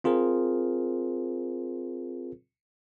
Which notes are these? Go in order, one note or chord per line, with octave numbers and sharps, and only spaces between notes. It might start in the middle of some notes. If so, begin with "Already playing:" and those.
C4 F4 G#4 A#4 C5